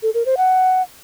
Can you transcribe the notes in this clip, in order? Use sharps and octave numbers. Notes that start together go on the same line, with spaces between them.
A4
A#4
C5
F#5